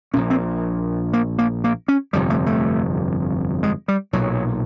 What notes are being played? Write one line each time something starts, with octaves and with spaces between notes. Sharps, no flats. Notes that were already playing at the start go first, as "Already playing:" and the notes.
A#1 A#2 C#4
C4
A#3
A#3
A#3
C#4
G1 F2 C3 G3
A3
A3
G#3
G3
B1 A#2 F#3